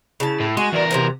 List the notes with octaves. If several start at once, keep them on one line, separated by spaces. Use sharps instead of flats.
C#3 E4 A5
A2
G#3 F#4 G#5
E2 A#4 D5
C3 F#3 C5 A#5